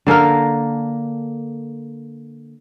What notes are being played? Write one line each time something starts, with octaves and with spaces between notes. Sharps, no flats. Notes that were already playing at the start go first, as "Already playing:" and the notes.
D3 A#3 A4 A#4